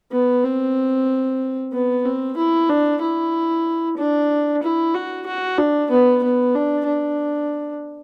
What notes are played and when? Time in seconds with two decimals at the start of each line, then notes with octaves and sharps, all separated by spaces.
0.12 B3
0.44 C4
1.73 B3
2.05 C4
2.37 E4
2.69 D4
3.01 E4
3.98 D4
4.63 E4
4.94 F#4
5.27 F#4
5.58 D4
5.91 B3
6.23 B3
6.55 D4
6.87 D4